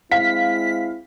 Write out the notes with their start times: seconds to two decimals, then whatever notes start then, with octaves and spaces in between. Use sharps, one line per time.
0.11 G#3 C4 E4 F5 B6